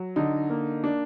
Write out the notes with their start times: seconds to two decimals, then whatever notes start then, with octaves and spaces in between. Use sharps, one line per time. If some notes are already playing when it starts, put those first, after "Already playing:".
Already playing: F#3
0.16 D3 D#4
0.50 A#3
0.84 D4